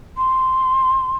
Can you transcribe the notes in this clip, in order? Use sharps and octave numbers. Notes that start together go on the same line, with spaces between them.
C6